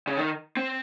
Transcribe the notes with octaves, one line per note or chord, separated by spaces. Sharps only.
C#3
D#3
C4